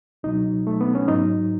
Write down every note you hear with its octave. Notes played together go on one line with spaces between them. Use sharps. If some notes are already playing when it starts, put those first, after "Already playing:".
C#2 B2 F#3 D#4
A3
B3
C#4
G#2 F#3 D#4